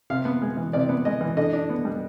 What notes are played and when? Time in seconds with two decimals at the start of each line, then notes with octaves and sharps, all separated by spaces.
0.10 C3 F5
0.25 B3
0.42 G#3
0.57 E3
0.73 C3 D5
0.89 B3
1.05 G#3 D#5
1.21 E3
1.37 D3 D#5
1.53 D4
1.70 B3
1.85 G3